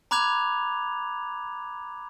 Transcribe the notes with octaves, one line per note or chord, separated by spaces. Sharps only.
A#5 B5 D6 F#6 G#6 F7